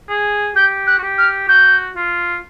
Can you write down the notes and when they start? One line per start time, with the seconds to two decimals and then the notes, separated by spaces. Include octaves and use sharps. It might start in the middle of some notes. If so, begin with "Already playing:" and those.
0.09 G#4
0.56 G4 G6
0.87 F#6
0.98 F#4
1.03 G4
1.18 F6
1.48 F#4 G6
1.96 F4